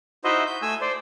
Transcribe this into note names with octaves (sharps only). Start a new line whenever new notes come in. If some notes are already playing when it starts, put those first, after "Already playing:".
D#4 E4 F#4 C5 D#5 E5
G6
A3 G#5 E6
C5 D5